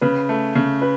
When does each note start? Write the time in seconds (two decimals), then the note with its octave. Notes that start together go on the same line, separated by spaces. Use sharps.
0.01 C#3 B4
0.29 A3
0.55 C#3
0.82 B4